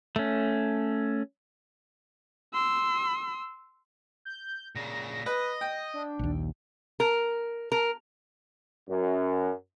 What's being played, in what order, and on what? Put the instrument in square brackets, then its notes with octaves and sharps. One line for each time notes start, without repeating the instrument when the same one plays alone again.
[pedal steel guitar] A3 C#4
[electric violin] C6 E6
[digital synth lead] G6
[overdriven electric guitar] A#2 C#3 [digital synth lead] A#6
[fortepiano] B4 [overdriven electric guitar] D#5
[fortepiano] G5
[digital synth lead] D4
[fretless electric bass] A#1 D#2
[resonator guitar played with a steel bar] A#4
A#4
[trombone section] F#2